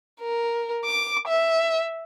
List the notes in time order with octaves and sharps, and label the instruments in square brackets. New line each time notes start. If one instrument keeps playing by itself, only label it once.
[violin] A#4
D6
E5